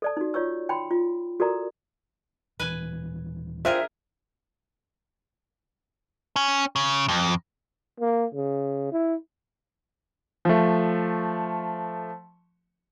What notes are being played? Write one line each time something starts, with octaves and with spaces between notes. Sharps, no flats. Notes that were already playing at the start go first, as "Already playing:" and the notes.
A4 D5 A5
D#4 F#4
F4 C#5 D5 C#6 E6
G5 A5 B5 C6
F4
F#4 A4 A#4 D5 A#5
D#1 E3 B4 G#5
D4 F4 G#4 A#4 C5 E5 G5
C#4
C#3
F2
A#3
C#3
E4
F3 A3